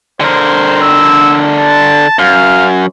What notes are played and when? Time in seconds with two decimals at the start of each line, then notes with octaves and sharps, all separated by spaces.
0.21 D3 A#4 C5
0.81 E6
1.57 A5
2.19 F#2 F5